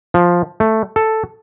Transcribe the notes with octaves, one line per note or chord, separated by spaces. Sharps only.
F3
A3
A4